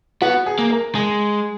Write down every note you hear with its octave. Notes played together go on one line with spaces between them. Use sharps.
B3 F#4
G#4
A#3
A#4
G#3 G#4